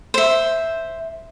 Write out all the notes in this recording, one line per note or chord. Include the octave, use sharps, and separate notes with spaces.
C5 E5